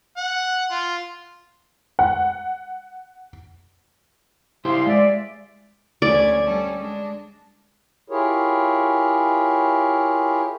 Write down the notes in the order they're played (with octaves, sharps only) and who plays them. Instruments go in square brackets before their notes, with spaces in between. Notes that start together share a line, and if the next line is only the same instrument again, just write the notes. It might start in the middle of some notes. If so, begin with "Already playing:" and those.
[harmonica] F#5
F4
[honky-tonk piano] F#5
[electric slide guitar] E4 G4 C5 [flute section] F5 C6
[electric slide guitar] G#3 [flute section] D5 E5
[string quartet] D2 C#4 G#6 [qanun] D5
[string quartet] G3 C#4 A4
G#3 D4
[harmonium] E4 F4 G4 G#4 A#4 C#5